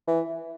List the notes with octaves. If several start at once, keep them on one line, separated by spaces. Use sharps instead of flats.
E3